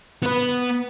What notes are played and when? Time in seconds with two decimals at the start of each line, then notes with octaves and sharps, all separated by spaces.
0.22 B3 B4